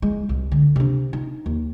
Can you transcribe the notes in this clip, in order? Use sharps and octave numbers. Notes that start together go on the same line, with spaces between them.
G#3
C2
D3
C3 D4
D#4
D#2